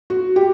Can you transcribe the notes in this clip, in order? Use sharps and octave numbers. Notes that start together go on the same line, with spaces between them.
F#4
G4